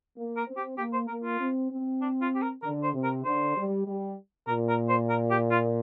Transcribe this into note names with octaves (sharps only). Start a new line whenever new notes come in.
A#3
A#4
C4
G4
A#3 G4
C5
A#3 A#4
F4
C4
C4
D4
F4
G4
A#4
D3 A#4
C5
C3
A#4
D3 C5
G3
G3
A#2 A#4
A#4
C5
A#4
G4
F4